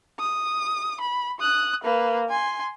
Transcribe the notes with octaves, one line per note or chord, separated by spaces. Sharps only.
D#6
B5
D#6 F#6
A#3 B4
G#5 C6